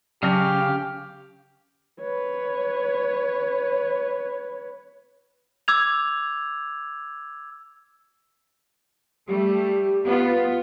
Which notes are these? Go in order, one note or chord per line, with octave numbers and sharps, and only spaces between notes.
C#3 F#3 C#4 G4 F6
B4 C#5
D6 E6 G#6 F7
G3 A3 G4
B3 F4